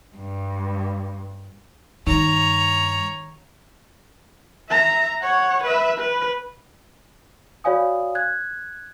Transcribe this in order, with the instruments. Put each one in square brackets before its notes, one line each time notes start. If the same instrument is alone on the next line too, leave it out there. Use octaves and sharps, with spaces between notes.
[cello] G2
[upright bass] G2 [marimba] D#3 D#4 [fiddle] C#5 A#5
[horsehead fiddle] E5 A#5
C#5 F#5
B4 E5
B4
[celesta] F#4 C#5 D5 F5 G#5 D#6
F#6 G#6